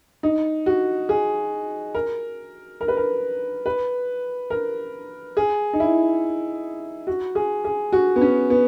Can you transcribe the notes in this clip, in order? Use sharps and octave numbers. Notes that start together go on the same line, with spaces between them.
D#4
F#4
G#4
A#4
A#4
B4
A#4
B4
A#4
G#4
D#4
E4
F#4
G#4
G#4
F#4
B3
C#4
B3